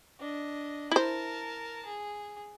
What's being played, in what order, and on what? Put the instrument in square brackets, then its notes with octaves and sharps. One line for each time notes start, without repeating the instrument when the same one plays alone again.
[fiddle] D4 D#5
[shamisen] E4 C5 [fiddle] A#4 A5
[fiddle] G#4